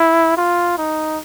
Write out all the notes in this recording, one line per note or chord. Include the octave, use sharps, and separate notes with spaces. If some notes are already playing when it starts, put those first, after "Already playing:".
Already playing: E4
F4
D#4